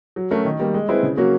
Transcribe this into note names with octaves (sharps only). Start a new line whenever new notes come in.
F#3
A3 C#4 F#4 A#4
D#3
G3 A#3
G#3
C4 E4 G#4 B4
C#3
F#3 A#3 C#4 F#4